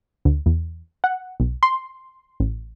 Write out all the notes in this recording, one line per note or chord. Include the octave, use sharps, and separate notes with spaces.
D2
E2
F#5
B1
C6
A1